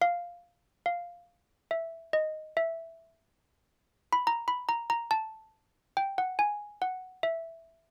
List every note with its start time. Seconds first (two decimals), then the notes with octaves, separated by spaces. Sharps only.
0.02 F5
0.86 F5
1.71 E5
2.13 D#5
2.57 E5
4.13 B5
4.27 A#5
4.48 B5
4.69 A#5
4.90 A#5
5.11 A5
5.97 G5
6.18 F#5
6.39 G#5
6.82 F#5
7.23 E5